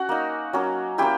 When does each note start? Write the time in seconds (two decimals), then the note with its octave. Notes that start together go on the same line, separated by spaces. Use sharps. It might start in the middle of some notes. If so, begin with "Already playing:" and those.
Already playing: C#4 F#4 F#5
0.09 A#3 D#4
0.53 F#3 A#3 C#4
0.98 A#3 C#4 E4 G4 G5